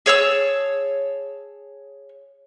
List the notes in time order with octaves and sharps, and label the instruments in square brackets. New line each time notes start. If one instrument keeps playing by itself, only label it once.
[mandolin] G#4 C#5 A5 E6